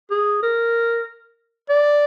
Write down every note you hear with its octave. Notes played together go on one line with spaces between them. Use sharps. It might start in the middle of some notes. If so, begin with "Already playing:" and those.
G#4
A#4
D5